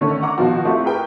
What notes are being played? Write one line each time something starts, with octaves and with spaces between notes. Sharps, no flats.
D3 D#3 A3 C#4
F#5 A#5 D6
B2 D#3 F3 F4 F#4
A3 C4 E4 F4 G4
G4 G#4 A#4 B4 G5